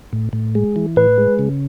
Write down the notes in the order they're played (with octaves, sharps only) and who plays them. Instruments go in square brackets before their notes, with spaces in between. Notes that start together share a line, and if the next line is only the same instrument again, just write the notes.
[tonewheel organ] A2
A2
G#3
E3
[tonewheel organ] A2 [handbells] B4
[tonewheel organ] G#3
C#3